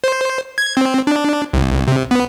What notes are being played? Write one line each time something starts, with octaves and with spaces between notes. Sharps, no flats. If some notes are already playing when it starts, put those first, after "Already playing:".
C5
G#6
C4
D4
C2
C3
B3